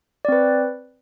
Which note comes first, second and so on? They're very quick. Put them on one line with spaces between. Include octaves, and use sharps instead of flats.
D5 C4 B4